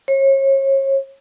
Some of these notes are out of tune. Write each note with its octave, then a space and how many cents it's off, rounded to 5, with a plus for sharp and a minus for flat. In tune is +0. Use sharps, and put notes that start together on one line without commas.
C#5 -35